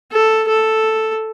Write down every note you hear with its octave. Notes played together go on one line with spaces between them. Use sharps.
A4
A4